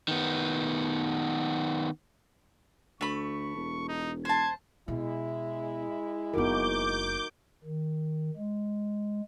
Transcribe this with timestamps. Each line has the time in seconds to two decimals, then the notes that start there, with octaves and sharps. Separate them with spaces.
0.08 D#3 B3
3.01 D2 A3 B5 C#6
3.56 E1
3.89 D#4
4.25 C5 A5 G#6
4.88 B2 G#3 E4
6.34 F#1 B3 D#4 F#4 A#4 D6 G6
7.64 D#3
8.37 G#3